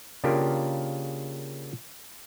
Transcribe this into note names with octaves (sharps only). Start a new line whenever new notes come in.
C#3 A#3 D4 F4 G4 A#4